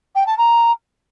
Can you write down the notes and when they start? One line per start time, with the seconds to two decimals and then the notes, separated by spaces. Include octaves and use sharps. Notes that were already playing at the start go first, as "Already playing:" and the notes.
0.16 G5
0.27 A5
0.38 A#5